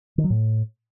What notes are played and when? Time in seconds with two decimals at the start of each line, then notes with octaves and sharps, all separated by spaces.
0.18 D#3
0.24 F#3
0.30 A2